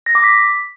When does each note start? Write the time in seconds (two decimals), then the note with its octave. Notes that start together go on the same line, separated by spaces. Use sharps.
0.06 A#6
0.15 D6
0.24 B6